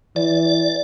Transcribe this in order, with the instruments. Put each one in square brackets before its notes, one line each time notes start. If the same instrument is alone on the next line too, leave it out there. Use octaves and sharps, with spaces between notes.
[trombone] E3 [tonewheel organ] D5